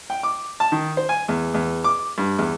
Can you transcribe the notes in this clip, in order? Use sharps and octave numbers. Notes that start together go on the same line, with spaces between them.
G5
D6
A5
D#3
C5
G#5
E2
E2
D6
G2
E2